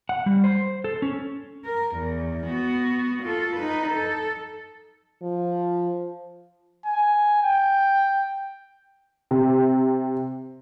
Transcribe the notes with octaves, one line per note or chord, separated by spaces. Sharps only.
F#5
G3
C5
A4
C#4
A#4
E2
B3 F#4
F4 A4
D#4 B4
A4
F3
G#5
G5
C3